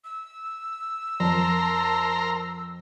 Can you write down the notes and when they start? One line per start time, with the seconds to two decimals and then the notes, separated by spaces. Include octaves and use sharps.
0.04 E6
1.20 F2 A#4 A5 A#5 C6